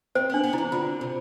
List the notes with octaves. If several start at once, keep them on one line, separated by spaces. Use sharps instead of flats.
C4 C5
B3 D4
B3
D3 E4
E3
D3 F4
C3